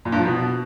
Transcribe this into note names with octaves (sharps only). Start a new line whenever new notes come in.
A#2
G2
F3
B2